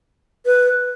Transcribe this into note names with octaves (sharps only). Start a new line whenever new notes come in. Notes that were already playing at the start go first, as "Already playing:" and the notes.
B4